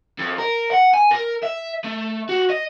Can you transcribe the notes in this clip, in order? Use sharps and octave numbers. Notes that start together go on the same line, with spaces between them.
F2
A#4
F#5
G#5
A#4
E5
A3
F#4
D#5